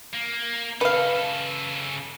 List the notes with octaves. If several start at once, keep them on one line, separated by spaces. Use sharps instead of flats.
A#3
C#3 A4 B4 F5